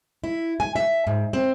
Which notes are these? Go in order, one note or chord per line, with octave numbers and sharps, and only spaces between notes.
E4
G#5
E5
G#2
C4